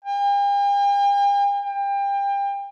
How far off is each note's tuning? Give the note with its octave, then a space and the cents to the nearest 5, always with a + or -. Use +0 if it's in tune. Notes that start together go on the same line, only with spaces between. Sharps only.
G5 +45
G5 +30